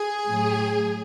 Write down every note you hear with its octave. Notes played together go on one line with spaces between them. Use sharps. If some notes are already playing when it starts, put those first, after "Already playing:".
Already playing: G#4
A2 F#3